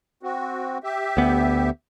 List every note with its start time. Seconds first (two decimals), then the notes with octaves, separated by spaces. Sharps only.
0.23 C4 F#4
0.83 G4 E5
1.17 D2 B3